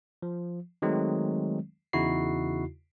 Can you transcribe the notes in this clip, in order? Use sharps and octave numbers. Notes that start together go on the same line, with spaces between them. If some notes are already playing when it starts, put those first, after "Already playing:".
F3
D#3 F#3 G#3 A3 C4
E2 C#3 D#4 E4 F#4 C7